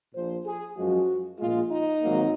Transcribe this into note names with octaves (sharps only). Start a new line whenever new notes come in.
A#1 A#2 F3 C5
G#4
F#2 F3 G#3 F#4
A#1 A#2 G#3 F4
D#4
G#1 G#2 F#3 A#3